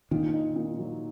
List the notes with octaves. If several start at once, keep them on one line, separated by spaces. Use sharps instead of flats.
A#2 D#3
D#4
A#2
F#3